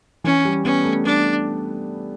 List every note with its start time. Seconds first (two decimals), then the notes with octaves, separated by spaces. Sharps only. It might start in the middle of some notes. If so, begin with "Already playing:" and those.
0.24 E3 C#4
0.45 G3
0.65 B3 C#4
0.84 A3
1.05 G3 D4